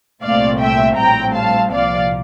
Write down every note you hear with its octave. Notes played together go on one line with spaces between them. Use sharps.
C2 A#2 A3 C4 D5 F5
E5 G5
A#1 A2 G3 C4 G5 A#5
F5 A5
C2 A#2 F3 D5 F5